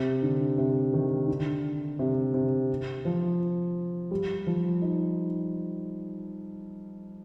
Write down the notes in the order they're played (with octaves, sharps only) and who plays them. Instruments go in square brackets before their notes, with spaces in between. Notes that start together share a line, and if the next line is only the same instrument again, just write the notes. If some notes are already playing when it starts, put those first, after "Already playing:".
Already playing: [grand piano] C3
D3
C3
D#3
D3
C3
C3
F3
G3
F3
D#4